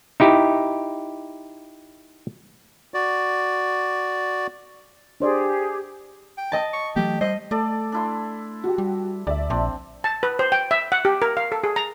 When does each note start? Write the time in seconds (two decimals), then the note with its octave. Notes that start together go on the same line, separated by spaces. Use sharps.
0.20 D#4 E4 G4
2.94 F#4 D5
5.20 D4 G4 G#4 C5 D5
6.38 G5
6.52 D#5 A5
6.73 C#6
6.96 E3 F#3 A3 G4
7.21 G3 C5 D#5
7.51 A3 A4 D5
7.92 D4 E4 C6
8.64 F#4 G4
8.78 G3
9.27 D2 D5 E5
9.50 A#1 C4 D4
10.04 A5
10.23 B4
10.39 C5
10.52 G5
10.71 E5
10.92 F#5
11.05 G4
11.22 A#4
11.37 F5
11.52 A4
11.64 G#4
11.76 A#5